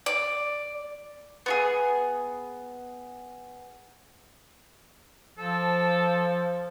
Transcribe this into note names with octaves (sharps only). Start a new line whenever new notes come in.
D5
B3 F#4 G#4
F3 A4